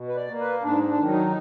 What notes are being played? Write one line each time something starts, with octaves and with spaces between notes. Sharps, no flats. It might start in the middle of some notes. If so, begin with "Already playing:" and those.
Already playing: B2
B4
D5
A#3
B4
G#2 D4
D4
D#3 F#3
D#4